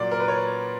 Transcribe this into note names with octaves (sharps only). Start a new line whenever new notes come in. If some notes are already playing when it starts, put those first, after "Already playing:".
Already playing: A#2 F#3 A#3 D5
A#4
B4
C#5